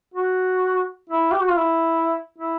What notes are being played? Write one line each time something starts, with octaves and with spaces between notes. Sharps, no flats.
F#4
E4
G4
F#4
F4
E4
E4